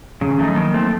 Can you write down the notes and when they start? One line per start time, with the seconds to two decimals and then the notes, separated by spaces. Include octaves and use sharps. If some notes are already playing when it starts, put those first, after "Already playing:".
0.21 C#3 F3
0.31 D#3
0.39 F3 A3
0.43 F#3 D#4
0.56 D#3 A#3
0.74 A3 C4